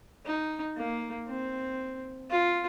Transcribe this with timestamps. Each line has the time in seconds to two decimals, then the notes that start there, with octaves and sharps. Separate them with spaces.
0.26 D#4
0.77 A#3
1.27 C4
2.30 F4